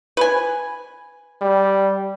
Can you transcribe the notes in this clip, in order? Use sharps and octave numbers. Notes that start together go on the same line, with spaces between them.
B4 G#5
G3